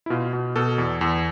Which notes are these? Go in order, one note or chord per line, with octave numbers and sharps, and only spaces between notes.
E4
B2 F4
B2
B2 A4
E2
E2